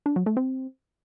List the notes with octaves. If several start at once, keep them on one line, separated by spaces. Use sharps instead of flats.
D4
F#3
A3
C4